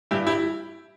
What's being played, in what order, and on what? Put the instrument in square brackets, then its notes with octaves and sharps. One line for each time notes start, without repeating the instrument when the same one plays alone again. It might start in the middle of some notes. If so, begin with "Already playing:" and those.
[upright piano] G2 E4 G4
E4 G4